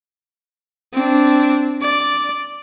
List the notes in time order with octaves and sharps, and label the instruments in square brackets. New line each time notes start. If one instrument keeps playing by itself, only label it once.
[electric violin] C4 D4
D5